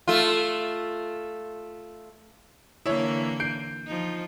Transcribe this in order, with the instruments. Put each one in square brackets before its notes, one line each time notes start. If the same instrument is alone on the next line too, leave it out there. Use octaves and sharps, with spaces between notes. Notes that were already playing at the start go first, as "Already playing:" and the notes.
[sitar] A3 F4
[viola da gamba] D3 E3 A#3 [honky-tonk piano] E4 C#5
[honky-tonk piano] G6 C7 D7
[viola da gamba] F3 D#4